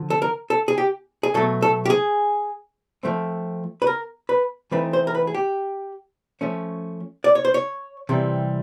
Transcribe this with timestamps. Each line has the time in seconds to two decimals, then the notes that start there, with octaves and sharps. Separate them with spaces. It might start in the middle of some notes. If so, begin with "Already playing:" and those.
Already playing: D3 F3
0.10 A4
0.22 A#4
0.50 A4
0.68 G#4
0.78 G4
1.23 G#4
1.34 B2 F#3 A3 A4
1.62 A4
1.85 G4
1.90 G#4
3.03 F3 A3 C4
3.82 B4
3.87 A#4
4.29 B4
4.71 E3 A3 C4 D#4 B4
4.93 C5
5.07 A#4
5.15 B4
5.27 G#4
5.34 G4
6.41 F3 A3 C#4
7.24 D5
7.35 C#5
7.45 C5
7.54 C#5
8.09 C3 E3 G3 C4